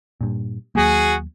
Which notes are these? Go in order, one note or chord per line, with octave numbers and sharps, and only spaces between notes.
G2 A#2
D#2 F#3 A#3 F#4 G#4